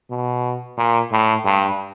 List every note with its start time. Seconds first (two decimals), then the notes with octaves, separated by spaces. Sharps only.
0.11 B2
0.78 A#2
1.11 A2
1.45 G2